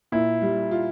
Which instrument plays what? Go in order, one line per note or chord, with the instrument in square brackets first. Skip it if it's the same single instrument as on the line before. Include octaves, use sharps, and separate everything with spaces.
[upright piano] A#2 [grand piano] E4
[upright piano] G3
F4